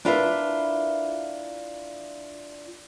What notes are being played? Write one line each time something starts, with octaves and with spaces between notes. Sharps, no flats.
D4 E4 F4 A#4 B4 E5